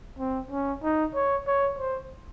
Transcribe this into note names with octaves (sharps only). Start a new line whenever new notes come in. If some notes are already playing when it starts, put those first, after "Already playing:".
C4
C#4
D#4
C#5
C#5
C5